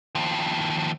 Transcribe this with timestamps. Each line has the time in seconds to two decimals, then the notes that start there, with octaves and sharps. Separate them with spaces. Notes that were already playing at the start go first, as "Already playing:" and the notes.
0.15 D#2 F3